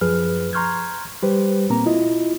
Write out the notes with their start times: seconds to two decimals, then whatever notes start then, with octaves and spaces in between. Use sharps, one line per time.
0.01 F#2 F3 G#4 B4 F6
0.53 A#5 C6 C#6 F6 G6 G#6
1.23 G3 G4 B4 C5
1.70 A#2 A#3 C4 A#5
1.86 E4 F4 D#5